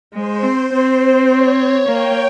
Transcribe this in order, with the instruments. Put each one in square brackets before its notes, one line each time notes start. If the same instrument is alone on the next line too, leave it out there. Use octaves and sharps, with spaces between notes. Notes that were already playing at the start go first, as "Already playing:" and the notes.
[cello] G#3 [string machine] C5
[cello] C4
C4
[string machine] C#5
[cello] A#3 [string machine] G5